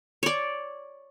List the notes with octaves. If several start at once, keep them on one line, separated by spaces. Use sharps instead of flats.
C#5 D5